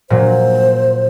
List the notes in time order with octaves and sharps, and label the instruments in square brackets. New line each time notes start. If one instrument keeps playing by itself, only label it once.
[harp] A#2 F#3 [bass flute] C5